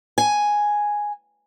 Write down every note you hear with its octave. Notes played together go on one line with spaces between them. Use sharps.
G#5